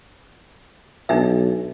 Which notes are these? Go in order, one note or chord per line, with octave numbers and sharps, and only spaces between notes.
B1 D4 D#4 E5